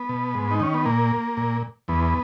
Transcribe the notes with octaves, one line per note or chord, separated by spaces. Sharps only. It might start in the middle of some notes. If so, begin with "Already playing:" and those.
Already playing: B3
B2
G#2
D#4
D#3 C#4
B3
A#2 A#3
A#2
E2 B3